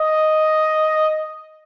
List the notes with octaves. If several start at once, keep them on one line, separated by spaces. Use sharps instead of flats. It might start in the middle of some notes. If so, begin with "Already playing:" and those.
Already playing: D#5